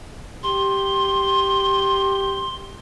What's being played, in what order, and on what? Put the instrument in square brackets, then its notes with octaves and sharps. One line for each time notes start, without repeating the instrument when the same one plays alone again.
[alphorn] G4 [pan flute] C6